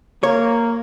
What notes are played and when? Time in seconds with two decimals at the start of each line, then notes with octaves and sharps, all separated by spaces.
0.23 A#3 C#5